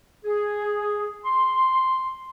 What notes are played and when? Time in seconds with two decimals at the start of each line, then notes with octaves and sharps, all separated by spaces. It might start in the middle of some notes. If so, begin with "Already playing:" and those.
0.25 G#4
1.24 C6